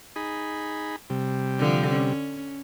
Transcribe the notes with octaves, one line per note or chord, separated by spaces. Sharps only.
D#4 G#4 B5
C3 G3
D3 F3
C#4